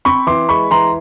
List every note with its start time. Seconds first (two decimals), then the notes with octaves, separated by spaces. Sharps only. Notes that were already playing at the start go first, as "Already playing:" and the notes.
0.05 C4 B5 C#6
0.27 E3 C6 D6
0.49 G#3 B5 C#6
0.71 E3 A#5 C6